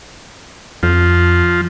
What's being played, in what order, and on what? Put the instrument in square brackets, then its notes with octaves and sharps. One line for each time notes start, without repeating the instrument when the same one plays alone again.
[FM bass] F2 [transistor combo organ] F3